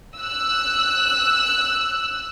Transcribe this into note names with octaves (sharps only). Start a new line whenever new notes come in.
E6 F#6